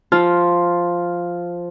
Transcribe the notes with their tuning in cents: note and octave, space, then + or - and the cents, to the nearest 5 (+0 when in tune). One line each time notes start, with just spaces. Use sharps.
F3 +0 F4 +0